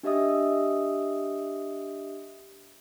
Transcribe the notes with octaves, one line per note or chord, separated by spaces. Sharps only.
D4 G4 D#5 E5 D#6